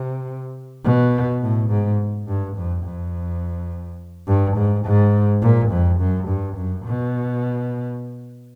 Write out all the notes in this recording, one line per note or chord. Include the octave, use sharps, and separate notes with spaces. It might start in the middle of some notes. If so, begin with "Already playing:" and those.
Already playing: C3
B2
A2
G#2
G2
F2
F2
G2
G#2
G#2
A#2
F2
F#2
G2
F#2
B2